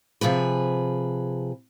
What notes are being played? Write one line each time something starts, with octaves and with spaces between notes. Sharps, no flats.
C3 F3 G#4 B4